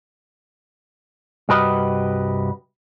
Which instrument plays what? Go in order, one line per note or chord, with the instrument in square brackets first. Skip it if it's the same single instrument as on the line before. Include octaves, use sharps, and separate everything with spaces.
[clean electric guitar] C2 G2 F#4 G4 B4 D#5